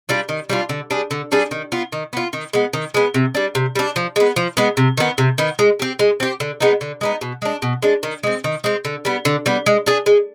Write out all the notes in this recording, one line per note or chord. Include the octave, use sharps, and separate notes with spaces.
G3 D4 F4
D#3
G3 D4 F4
D3
G3 D4 G#4
D3
G3 D4 G#4
D#3
B3 F4
D#3
B3 F4
D#3
G#3 B3
D#3
G#3 B3
C3
G3 D4
C3
G3 D4
F3
G#3 B3
F3
G#3 B3
C3
D#3 B3
C3
D#3 B3
G#3
C4 G4
G#3
C4 G4
D3
G#3 B3 D#4
D3
G#3 B3 D#4
B2
G#3 D4
B2
G#3 D4
D#3
G#3 C4
D#3
G#3 C4
D3
G3 B3
D3
G3 B3
G#3
D4 G#4
G#3